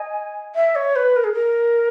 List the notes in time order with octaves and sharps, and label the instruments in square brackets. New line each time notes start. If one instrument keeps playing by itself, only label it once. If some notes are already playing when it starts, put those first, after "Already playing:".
Already playing: [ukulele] D#5 [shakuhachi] G#5
[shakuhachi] E5
C#5
B4
A#4
G#4
A#4